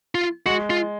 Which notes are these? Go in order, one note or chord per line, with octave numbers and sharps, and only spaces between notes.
F4
G#3 F#4
F4